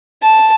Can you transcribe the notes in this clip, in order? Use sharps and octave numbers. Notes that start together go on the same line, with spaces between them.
A5